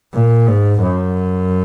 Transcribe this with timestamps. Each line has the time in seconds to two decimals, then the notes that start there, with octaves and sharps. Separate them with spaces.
0.14 A#2
0.47 G#2
0.82 F#2